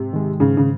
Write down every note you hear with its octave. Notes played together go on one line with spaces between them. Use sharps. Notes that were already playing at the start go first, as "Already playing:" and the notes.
Already playing: G#2 C3
D#3 G#3
G#2 C#3
C#3